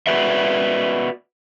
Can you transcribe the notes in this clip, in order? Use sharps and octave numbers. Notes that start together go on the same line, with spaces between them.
F#4 B4 D5 E5